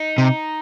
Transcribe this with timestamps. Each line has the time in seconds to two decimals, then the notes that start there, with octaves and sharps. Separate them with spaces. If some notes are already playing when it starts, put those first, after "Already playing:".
Already playing: D#4
0.18 C3